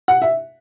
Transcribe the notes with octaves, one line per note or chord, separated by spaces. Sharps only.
F#5
E5